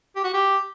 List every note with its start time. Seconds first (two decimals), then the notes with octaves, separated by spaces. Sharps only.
0.16 G4
0.24 F#4
0.34 G4